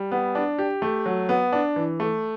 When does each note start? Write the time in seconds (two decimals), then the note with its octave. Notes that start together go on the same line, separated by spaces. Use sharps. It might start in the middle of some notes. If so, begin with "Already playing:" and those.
Already playing: G3
0.12 B3
0.35 D4
0.59 G4
0.82 A3
1.06 F#3
1.29 B3
1.52 D4
1.76 E3
2.00 A3